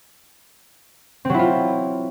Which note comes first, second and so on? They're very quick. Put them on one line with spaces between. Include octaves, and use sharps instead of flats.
C4 F#3 E4 F4